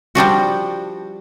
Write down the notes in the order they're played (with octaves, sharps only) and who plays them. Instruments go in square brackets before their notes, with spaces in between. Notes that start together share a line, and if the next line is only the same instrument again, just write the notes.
[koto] F3 G3 D4 F#4